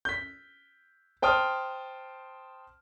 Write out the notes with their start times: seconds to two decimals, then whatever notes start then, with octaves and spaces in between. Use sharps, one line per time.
0.05 G6 B6
1.22 C5 G5 A5 D#6 F6